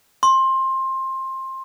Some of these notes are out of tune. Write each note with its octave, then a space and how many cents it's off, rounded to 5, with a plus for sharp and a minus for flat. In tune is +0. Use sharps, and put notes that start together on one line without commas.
C6 +20